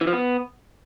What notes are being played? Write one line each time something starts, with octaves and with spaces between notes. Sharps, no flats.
E3
F3
B3